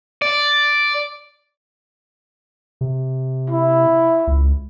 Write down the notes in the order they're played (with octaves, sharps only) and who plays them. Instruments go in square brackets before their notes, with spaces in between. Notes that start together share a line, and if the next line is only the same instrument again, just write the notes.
[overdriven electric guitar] D5
[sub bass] C3
[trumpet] E4
[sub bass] C#2